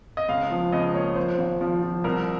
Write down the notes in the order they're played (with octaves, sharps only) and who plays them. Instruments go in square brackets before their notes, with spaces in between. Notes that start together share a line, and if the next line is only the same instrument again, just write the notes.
[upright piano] D#5
C#2 F5
F3
C#2 D#5
A#3 C#5
F3 C5
G#1
F3
F3
C2 A#4